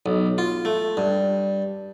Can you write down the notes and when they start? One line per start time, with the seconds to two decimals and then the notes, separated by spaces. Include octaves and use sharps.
0.06 B1
0.38 F4
0.65 A3
0.97 G2